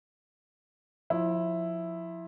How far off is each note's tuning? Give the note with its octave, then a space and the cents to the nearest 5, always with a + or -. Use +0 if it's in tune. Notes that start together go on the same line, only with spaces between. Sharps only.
F3 +20 E4 +0